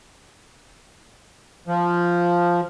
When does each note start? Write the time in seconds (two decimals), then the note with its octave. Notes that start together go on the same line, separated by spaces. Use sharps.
1.67 F3